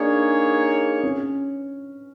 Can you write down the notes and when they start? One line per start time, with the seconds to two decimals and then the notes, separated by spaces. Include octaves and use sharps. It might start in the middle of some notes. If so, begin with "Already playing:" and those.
Already playing: A#3 D4 D#4 G#4 C#5
1.03 C#4